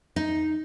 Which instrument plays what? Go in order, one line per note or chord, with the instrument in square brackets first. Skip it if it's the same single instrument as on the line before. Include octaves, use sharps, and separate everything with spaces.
[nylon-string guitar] D#4